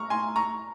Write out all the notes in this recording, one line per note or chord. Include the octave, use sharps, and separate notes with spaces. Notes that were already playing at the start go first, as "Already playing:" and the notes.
Already playing: A#5 C#6 F6
G#5 C6
A#5 C#6